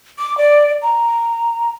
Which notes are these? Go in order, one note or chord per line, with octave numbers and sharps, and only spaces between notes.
D6
D5
A#5